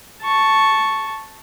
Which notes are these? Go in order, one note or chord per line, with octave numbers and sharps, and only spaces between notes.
A5 C#6